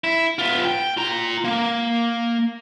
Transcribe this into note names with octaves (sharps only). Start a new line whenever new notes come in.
E4
B3 F4
G5
F4 A#5
A#3